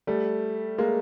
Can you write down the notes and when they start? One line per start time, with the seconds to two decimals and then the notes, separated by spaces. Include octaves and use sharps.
0.07 G3 A3
0.78 G#3 A#3